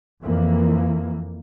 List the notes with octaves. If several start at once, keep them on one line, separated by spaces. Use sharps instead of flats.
F2 E3 A#3